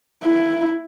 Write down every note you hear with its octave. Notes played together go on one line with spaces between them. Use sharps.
E4